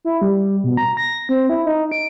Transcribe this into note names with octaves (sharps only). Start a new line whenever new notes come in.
E4
G3
B2
A#5
A#6
C4
E4
D#4
D7